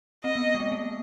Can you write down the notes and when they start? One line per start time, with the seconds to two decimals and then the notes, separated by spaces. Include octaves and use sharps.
0.24 C4 D#5
0.36 B3
0.55 G#3
0.60 A3
0.72 A#3